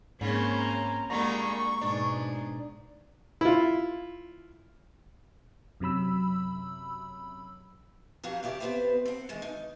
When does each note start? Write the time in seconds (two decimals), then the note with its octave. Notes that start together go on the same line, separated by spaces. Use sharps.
0.21 G#2 C#3 A#3 C4 C#4
0.56 A#5
1.10 A#2 D3 G3 G#3 A#3 A#5 C#6
1.81 G#2 B2 D4
3.41 E4 F4
5.80 F#2 C3 F#3 B5 E6
8.24 F2 F#3 F#4 G4 F5
8.43 C#3 E4 G4 D5
8.60 B3 C4 D#4 G4 B4 C5
9.05 C4 F#5
9.29 D#3 E3 G#3
9.42 D#4